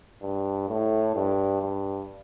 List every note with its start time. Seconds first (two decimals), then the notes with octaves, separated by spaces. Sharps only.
0.22 G2
0.69 A2
1.15 G2
1.61 G2